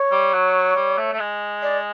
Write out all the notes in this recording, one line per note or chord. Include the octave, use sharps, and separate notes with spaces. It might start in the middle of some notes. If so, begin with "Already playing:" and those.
Already playing: C#5
G3
F#3
G3
A3
A3
G#3
D5